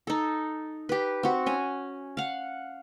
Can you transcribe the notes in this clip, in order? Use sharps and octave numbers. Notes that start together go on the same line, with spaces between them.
D#4 A4
G4 B4
C4 F#4
C#4 G#5
F5 F#5